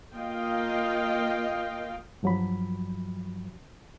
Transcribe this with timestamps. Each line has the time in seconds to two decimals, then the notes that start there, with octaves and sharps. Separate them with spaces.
0.15 A#3 F4 D#5 F5 G5
2.23 G2 F3 F#3 F#4 B5